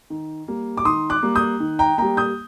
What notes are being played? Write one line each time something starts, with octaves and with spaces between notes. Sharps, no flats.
D#3
G3 A#3
D6
D#3 C6 D#6
D6 F#6
G3 A#3
D#6 G6
D#3
G5 A#5
G3 A#3 G5 A#5
D#6 G6